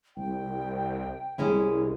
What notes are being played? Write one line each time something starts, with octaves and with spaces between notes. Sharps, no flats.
C2 G5
C2 G#3 C#4 E4